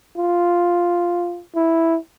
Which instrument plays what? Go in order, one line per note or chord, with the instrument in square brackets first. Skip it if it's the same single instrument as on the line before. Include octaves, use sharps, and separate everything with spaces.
[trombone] F4
E4